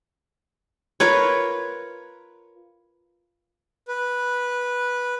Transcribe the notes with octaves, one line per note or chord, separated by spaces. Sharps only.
F4 A#4 B4 C#5
B4